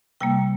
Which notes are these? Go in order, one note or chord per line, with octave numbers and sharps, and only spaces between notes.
C3 G3 A#3 G5